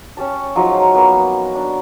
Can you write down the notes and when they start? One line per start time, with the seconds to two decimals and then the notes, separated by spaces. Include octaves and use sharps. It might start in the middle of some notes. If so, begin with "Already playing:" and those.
0.17 C#4 G4 A5
0.55 F3 F#3 G#3 D#4
0.95 A#3 B3
1.55 D4